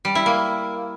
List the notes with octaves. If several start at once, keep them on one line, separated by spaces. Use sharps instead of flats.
G3
E4
A#3